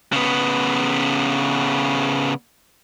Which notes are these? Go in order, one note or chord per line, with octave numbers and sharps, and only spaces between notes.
C#3 B3